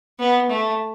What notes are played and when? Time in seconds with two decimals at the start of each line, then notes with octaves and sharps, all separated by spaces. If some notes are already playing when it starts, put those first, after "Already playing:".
0.19 B3
0.50 A3